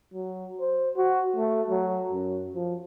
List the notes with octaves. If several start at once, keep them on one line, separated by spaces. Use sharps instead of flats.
F#3
C5
F#4
A3
F#3
F#2
F3